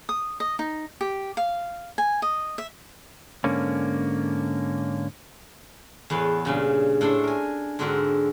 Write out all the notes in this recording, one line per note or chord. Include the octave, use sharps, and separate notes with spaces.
D#6
D#5
D#4
G4
F5
G#5
D#5
E5
G#2 D3 A#3 C#4
E2 A2 B3 B4
G2 A#2 C#3
A2 A3 D4 C6
A#4 G#5
G#2 D3 C4 F#4 A#4